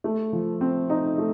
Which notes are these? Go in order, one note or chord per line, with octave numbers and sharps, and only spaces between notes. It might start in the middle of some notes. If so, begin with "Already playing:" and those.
A3
F3
C4
D#4
A3